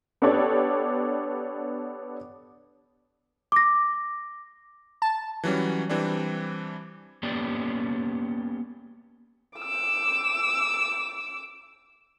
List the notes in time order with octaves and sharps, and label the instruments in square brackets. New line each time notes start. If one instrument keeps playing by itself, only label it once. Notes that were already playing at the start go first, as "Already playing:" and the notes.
[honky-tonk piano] B3 D4 G4 A4 C#5 D5
[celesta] D6 A#6
[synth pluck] A5
[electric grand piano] E3 F#3 G3 C#4
E3 G3 C4 D4
[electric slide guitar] A#3 B3 C#4 G4 D5
[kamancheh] D6 E6